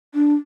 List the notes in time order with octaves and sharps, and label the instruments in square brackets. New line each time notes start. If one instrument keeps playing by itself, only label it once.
[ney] D4